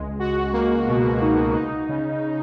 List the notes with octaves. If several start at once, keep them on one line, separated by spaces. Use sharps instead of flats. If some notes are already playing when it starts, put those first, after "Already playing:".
Already playing: C#2 G#3
F#4
A#3
B2
D#4
D#4
C#3